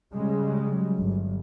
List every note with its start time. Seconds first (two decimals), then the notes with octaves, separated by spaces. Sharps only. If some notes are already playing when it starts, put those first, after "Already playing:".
0.14 C#3 G3 G#3
0.65 F#3
0.99 G1